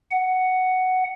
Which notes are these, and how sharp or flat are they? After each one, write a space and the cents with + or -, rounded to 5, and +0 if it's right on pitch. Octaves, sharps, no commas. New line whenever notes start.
F#5 +5